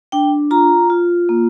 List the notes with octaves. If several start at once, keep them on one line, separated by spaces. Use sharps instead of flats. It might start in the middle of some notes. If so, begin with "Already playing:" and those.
D4 G5
F4 A#5
F4
A#3